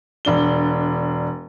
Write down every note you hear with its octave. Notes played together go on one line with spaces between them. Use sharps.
E1 D4 G7